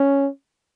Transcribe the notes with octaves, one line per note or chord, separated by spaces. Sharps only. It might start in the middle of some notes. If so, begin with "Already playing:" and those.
Already playing: C#4